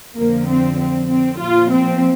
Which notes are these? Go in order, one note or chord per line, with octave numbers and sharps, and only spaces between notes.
F2 D3 F3 A#3
C4
C4
C4
A#2 F3 F4
C4